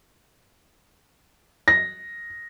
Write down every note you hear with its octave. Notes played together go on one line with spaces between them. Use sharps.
A#6